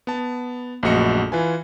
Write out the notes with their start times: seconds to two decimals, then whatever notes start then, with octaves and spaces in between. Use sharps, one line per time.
0.07 B3 A5
0.83 A#1 F#2 A3 F#4 D#5 C#7
1.32 E3 F4 B4 G#5